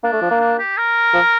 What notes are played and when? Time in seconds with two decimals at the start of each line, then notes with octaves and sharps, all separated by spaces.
0.03 A#3 D4
0.13 A3
0.22 F3
0.31 A#3
0.41 D4
0.59 G4
0.78 A#4
1.14 F3